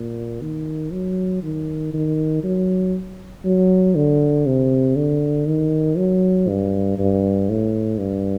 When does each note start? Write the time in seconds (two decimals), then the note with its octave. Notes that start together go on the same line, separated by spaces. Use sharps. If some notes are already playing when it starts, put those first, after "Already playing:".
Already playing: A#2
0.41 D#3
0.92 F#3
1.42 D#3
1.93 D#3
2.44 F#3
3.45 F#3
3.95 D3
4.46 C3
4.96 D3
5.47 D#3
5.97 F#3
6.48 G2
6.98 G2
7.49 A2
7.99 G2